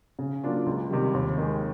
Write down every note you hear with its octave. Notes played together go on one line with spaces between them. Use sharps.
C#3
F#3 A#3 D4 F4
C#2
C3 D#3 G3
D#2
D#3 G#3